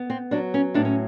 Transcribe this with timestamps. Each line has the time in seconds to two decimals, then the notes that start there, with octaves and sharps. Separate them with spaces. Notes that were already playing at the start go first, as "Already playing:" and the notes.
Already playing: B3
0.10 C4
0.31 F#3 D4
0.54 C#4
0.74 A2 D4
0.85 C#4